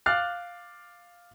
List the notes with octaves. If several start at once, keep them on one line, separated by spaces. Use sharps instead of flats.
F5 D6 F6 F#6 A6 C7